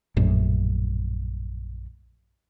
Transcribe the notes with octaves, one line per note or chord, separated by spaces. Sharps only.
A#1 F#2 A2